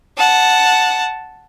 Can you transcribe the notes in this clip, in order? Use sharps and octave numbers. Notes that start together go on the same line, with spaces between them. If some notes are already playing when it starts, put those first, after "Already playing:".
F#5 A5